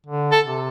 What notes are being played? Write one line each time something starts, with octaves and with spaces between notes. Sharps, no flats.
D3
A4
C3